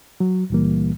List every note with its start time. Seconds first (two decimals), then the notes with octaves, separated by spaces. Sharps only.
0.20 F#3
0.50 C#2 A#2 E3 G3 A#3